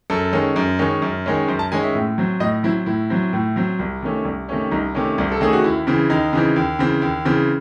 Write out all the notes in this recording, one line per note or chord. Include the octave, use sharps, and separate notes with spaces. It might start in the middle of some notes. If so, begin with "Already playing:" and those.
F#2 A4
D#3 G#3 C#4
F#2
D#3 G#3 C#4
F#2
D#3 G#3 C#4
F#2 C5
A5
D#3 G#3 C#4 G#5
E5
A2
F#3 C4
A2 D#5
F#3 C4 E4
A2 E4
F#3 C4
A2
F#3 C4
C2
C3 D#3 A3 C#4
C2
C3 D#3 A3 C#4
C2 D#4
C3 D#3 A3 C#4
C2 C5
A4
C3 D#3 A3 C#4 G#4
F#4
D#2 E4
C#3 E3 C4
D#2 D#4
C#3 E3 C4
D#2
C#3 E3 C4
D#2
C#3 E3 C4